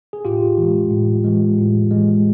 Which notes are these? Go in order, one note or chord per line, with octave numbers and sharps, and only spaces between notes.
G#4
A2 F4 G4
E3 G#3
A2
E3 G#3
A2
E3 G#3